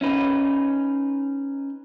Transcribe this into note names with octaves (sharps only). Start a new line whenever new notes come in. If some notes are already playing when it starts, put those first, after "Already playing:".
C#4 D#4 B4